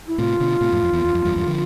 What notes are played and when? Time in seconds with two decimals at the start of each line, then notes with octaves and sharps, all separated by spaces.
0.08 E4
0.18 A2 C3 F4
0.40 B2 D3
0.61 A2 C3
0.72 F2 A2
0.83 F2
0.93 E2
1.04 E2
1.15 F2
1.25 E2 G2
1.36 E2 G2
1.47 D3 F3